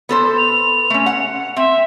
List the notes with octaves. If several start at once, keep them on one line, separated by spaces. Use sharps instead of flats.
B3 A4 C5
F7
A3 C#4
F#5
C4 E5